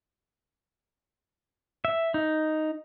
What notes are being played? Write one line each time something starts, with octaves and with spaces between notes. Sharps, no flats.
E5
D#4